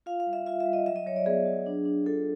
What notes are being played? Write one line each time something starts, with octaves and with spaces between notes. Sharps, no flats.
F4 F5
F5
G3
E5
F4 E5
E5
G3
D#5
F#3 E5
D#5
F#3 C#5
D5
B3 G#4
F#3
D4
D4
F4 A4